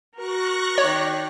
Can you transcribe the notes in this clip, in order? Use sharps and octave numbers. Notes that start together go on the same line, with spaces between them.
F#4 A#4 C#6 F#6 A#6
D#3 C#5 D5